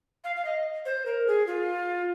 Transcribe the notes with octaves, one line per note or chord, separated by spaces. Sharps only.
F5
F5
D#5
C5
A#4
G#4
F4